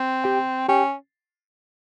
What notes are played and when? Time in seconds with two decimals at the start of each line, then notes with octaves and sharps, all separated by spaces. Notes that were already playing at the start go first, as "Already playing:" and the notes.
Already playing: C4
0.24 G4 G5
0.68 C#4 G4 G5